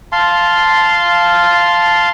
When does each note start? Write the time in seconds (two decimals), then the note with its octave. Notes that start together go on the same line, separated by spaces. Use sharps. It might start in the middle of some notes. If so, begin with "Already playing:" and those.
0.12 F5 A5 C6